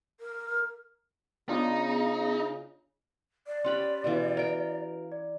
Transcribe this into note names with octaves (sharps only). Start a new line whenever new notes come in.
A#4
C#3 B3 D4 D#4 F4 D#5
D5
C#4 G4 B5 C6 F#6
B2 E3 F#4 B4 F5
A#4 G5
D5